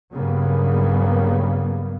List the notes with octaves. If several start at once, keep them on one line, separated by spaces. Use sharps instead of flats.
G2 C#3 F#3 G3 A#3 B3